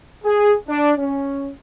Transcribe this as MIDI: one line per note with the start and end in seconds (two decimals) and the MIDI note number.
0.24 0.53 68
0.68 0.92 62
0.97 1.49 61